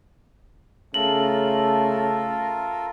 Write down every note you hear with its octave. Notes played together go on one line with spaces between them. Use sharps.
C#3 A3 F4 A4 A#4 F#7